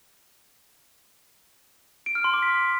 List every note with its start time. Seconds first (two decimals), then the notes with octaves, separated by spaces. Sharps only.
2.06 D7
2.15 F6
2.24 C6
2.33 D6
2.42 B6